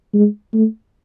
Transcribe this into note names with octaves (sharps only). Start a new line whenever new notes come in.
G#3
A3